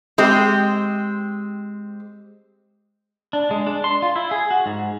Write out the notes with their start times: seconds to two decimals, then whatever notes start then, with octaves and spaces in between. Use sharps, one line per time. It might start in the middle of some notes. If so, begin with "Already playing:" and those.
0.18 G#3 C4 G4
3.33 D4
3.51 G#3
3.67 D4
3.84 C6
4.02 F4
4.16 E4
4.31 G#4
4.51 F#4
4.66 G#2